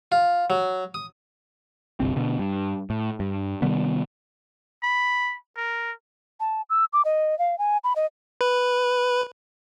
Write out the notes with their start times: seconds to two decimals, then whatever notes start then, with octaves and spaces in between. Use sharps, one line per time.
0.12 F4
0.50 F#3
0.94 D#6
2.00 G1 C2 C4
2.16 B2 D3
2.39 G2
2.90 A2
3.20 G2
3.62 C3 D#3 G3 B3
4.83 B5
5.57 A#4
6.40 A5
6.70 E6
6.93 D6
7.05 D#5
7.39 F5
7.59 G#5
7.84 B5
7.96 D#5
8.41 B4